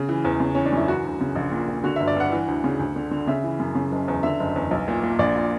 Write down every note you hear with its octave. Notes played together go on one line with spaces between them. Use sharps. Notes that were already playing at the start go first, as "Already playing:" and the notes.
Already playing: C#3
E3
E2
C#3
E3 C#4
D4
F#2 E4
E3 F#4
D2
C#3
A#1
A#2
A#2
D3 F#4
G1 E5
D5
G2 F#5
E3
D2
C#3
D2
D3
D3
C#3 E5
E3
F#2
C#3
F#1
E2
D3 E5
F#1
E2
B1
A#2
A#2
A#1 D5
A#2